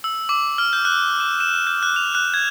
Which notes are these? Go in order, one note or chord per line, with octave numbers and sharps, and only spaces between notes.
E6
D6
F6
G6
F#6
E7
E7
G6
F#6
F7
F#6
G#6